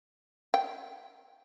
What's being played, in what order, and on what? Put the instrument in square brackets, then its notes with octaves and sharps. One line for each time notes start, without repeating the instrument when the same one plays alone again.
[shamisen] G5